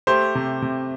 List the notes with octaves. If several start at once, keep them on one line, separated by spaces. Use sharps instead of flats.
A3 G4 C5
C3
C3